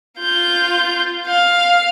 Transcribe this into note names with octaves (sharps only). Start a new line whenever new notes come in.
F4 G6
F5